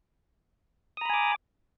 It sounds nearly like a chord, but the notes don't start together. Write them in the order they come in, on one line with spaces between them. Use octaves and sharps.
D#6 A#5 B5 G#5 D6